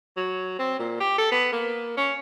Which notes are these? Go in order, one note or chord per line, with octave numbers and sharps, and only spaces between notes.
F#3
C4
A#2
G4
A4
B3
A#3
C#4